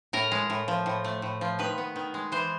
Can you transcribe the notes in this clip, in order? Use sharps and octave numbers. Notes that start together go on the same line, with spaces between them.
A2 A#4
G#3
A2
F3
A2
A3
A2
F3
D#3 B4
B3
D#3
G#3
E3 C5